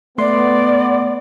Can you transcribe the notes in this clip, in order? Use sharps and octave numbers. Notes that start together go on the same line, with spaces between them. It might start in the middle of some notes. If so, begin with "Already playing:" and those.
A3 B3 D5 C6